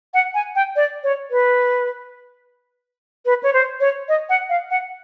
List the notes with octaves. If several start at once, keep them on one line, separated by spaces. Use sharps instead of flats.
F#5
G#5
G5
D5
C#5
B4
B4
C#5
C5
C#5
D#5
F#5
F5
F#5